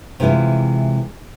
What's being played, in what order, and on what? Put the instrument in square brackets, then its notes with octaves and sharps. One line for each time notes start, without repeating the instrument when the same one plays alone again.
[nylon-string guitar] C3 E3 G#3 E4 F4